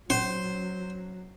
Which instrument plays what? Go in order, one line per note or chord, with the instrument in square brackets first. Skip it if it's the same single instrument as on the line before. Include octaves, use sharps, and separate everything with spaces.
[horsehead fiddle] F#3 [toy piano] C#4 [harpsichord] C5